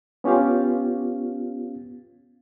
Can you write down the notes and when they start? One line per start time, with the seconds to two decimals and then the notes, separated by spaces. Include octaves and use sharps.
0.24 B3 C#4 F4 G4 F5